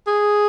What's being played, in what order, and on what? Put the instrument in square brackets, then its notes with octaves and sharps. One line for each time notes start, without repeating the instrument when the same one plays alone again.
[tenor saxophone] G#4